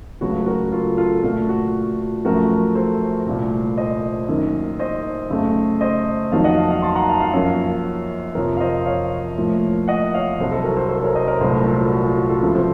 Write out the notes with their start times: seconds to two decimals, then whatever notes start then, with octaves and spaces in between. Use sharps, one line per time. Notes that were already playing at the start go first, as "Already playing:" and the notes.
0.21 C#2 C#3 F#3 A3 F#4
0.46 F#4 A#4
0.72 F4 A4
0.97 F4 A4
1.23 A#2 A3 F#4
1.49 F#4
2.25 F#2 F3 A3 F#4 A#4
2.75 A4 C5
3.26 C2 A#2 A3
3.77 C5 D#5
4.28 F#2 D#3 A#3
4.79 C5 D#5
5.30 F#2 C#3 A3
5.81 C5 D#5
6.32 F2 D#3 F#3 A#3 F5 A5
6.44 D#5 F#5
6.57 F5 A5
6.70 F5 A5
6.82 A5 C6
6.95 F#5 A#5
7.08 F5 A5
7.20 F5 A5
7.33 F#2 F3 A#3 C#5 F5
8.35 F2 C3 F3 A#4 C#5
8.57 F5
8.60 C5 D#5
8.86 C#5 F5
9.38 A2 F3 A#3
9.88 D#5 F#5
10.14 C#5 F5
10.38 C2 C3 F#3 A4 C5
10.52 A4 C5
10.64 F#4 A#4
10.77 A4 C5
10.89 A4 C5
11.02 A#4 C#5
11.15 C5 D#5
11.28 A#4 C#5
11.40 C2 A#2 F#3 A3 A4 C5
11.54 F#4 A#4
11.66 F4 A4
11.78 F#4
11.92 F#4
12.04 F4
12.17 F#4
12.29 F4 A4
12.42 C#2 C3 F3
12.55 A4 C5